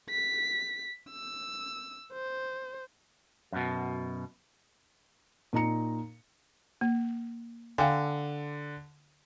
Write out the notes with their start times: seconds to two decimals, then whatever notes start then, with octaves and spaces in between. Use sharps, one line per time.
0.10 B6
1.11 E6
2.13 C5
3.52 F#2 B2
5.53 A#2 D#4 A#5 C#7
6.81 A#3
7.78 D3 F5 G5 G#5